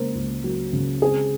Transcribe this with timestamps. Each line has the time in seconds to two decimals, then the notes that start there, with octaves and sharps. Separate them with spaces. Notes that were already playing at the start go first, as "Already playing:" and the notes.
Already playing: C#3 A#3 A#4 C5
0.15 C#2
0.44 F#3
0.73 C#3
1.02 C4 G#4